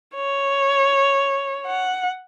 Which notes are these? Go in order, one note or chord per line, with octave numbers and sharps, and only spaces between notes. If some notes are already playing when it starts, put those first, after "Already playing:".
C#5
F#5